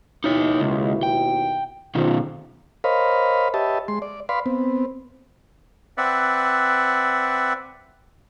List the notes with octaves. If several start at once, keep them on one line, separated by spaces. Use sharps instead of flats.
D#2 B2 D#4 E4 C#5
C#2
G5
B2 D#3 C4 F4
A#4 C5 C#5 D#5 F5 B5
G4 B4 C#5 D#5 E5 A5
G#3 C6
D5
B4 D5 F5 B5 C6
B3 C4
C4 B4 D5 E5 F#5